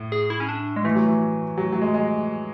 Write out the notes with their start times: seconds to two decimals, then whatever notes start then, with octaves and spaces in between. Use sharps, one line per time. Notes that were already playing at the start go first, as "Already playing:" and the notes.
Already playing: A2
0.12 G#4
0.30 E4
0.40 C#4
0.49 D4
0.76 G#3
0.84 E3 A3
0.95 F#3
1.07 E3
1.58 F#3
1.72 F#3
1.81 G#3
1.94 G#3